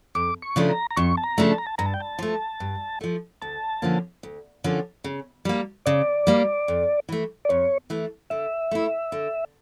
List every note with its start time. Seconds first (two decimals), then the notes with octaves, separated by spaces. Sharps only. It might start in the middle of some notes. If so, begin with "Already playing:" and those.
0.15 F2 D6
0.42 C#6
0.56 C#3 F3 A3 D4
0.69 A#5
0.91 A#5
0.96 F2 C#6
1.17 A5
1.24 A#5
1.38 C#3 F3 A3 D4
1.51 A5
1.58 A#5
1.67 A5
1.78 G2 A#5
1.86 A5
1.94 G5
2.00 A5
2.19 F3 A3
2.60 G2
3.01 F3 A3
3.42 D2 A5
3.82 D3 F3 A#3 C#4
4.23 D2
4.64 D3 F3 A#3 C#4
5.04 C#3
5.45 G3 A#3
5.86 C#3 D5
6.27 G3 A#3
6.68 F2
7.09 E3 A3
7.45 D5
7.49 F2 C#5
7.90 E3 A3
8.30 D3 E5
8.71 A3 E4
9.12 D3